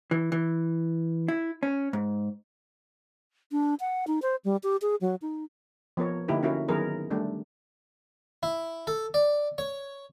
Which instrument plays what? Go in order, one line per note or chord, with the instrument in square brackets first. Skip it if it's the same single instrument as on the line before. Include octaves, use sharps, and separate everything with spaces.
[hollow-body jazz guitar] E3
E3
E4
C#4
G#2
[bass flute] D4
F#5
D#4
C5
G3
G4
G#4
F#3
D#4
[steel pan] F3 B3 A#4 C#5
D3 A#3 D#4 E4 G4 B4
C#4 E4 F#4 A#4
D#3 F#3 B3 G#4 A#4 B4
G3 A3 D4
[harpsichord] E4
A4
D5
C#5